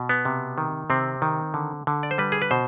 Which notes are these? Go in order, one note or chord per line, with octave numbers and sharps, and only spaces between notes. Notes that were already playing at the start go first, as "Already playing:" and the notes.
Already playing: B2
B3
C3
D#3
C3 C4
D#3
D3
D3
D5
C5
G3 B4
G#4
B4
B2 C5